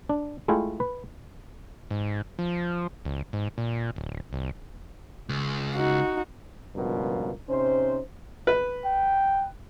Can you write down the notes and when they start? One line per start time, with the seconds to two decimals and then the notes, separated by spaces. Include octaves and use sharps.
0.09 D4
0.48 G#3 A3 E4 F4 G5 G#5
0.80 B4
1.91 G#2
2.39 F3
3.05 C#2
3.33 G#2
3.58 A#2
3.96 D1
4.33 C2
5.29 C#2
5.76 D#4 F#4
6.75 C#2 G2 B2 F3 F4 A#4
7.49 C3 C#4 D#4 C5
8.47 B4
8.85 G5